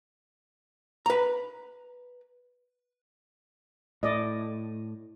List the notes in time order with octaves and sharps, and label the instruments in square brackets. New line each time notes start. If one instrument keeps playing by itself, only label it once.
[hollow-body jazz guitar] B4 A#5
[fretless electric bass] A2 [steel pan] E4 D5 D#5